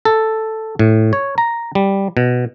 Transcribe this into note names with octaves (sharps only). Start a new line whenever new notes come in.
A4
A2
C#5
A#5
G3
B2